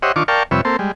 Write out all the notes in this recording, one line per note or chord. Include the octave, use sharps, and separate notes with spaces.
G4 C5 C#5 D#5 E5 F#5
D#3 D4 F4 C#6 D6
A#4 D5 F5 G5 A5 C#6
F2 C3 G3 B4 C#5 E5
A#3 C4 A4 C5
G3 G#3